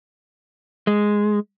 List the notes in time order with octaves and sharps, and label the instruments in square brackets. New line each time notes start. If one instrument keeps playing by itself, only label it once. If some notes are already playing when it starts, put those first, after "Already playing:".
[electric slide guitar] G#3